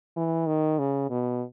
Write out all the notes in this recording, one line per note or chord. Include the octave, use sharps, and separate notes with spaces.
E3
D#3
C#3
B2